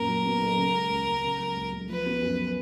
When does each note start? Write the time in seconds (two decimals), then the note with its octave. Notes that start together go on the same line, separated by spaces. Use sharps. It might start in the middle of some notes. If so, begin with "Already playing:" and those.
Already playing: F#2 A#2 A#4
0.09 F#3
0.25 B3
0.41 B1
0.58 C#3
0.74 G#3
0.91 C#2
1.07 C#2
1.23 C#3
1.40 F#3
1.56 C#2
1.72 C#2
1.89 F3 B4
2.06 B3
2.22 F#2